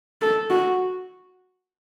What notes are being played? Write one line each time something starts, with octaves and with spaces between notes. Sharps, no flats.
A4
F#4